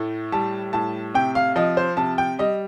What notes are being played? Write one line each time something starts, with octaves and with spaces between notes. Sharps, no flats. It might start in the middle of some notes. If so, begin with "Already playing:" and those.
Already playing: A2 A3
G3 A5
A2 A5
C3 G5
F5
F3 D#5
C5
C3 A5
G5
G3 D#5